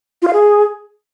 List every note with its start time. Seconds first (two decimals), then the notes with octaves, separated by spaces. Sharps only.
0.22 F4
0.28 F5
0.33 G#4